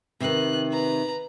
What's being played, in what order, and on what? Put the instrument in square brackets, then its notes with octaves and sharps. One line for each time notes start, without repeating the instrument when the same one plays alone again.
[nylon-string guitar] C3 D#3 [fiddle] B4 F#6
[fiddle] B4 A#5